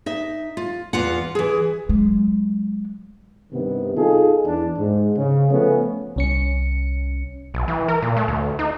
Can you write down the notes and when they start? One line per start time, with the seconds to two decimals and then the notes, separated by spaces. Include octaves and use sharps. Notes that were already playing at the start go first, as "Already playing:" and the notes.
0.06 D#4 E5
0.57 F4
0.93 E2 F4 F#5
1.35 E3 G#4
1.89 F#3 G#3
3.53 G2 C3 D#3 B3
3.96 D#4 F4 G#4 A4
4.45 E2 D4
4.78 G#2
5.17 C#3
5.51 F3 A3 B3 C#4
6.16 C2 C#4 C#7
7.54 B1
7.68 E3
7.88 A#4
8.02 A#2
8.17 A3
8.28 D2
8.59 D#4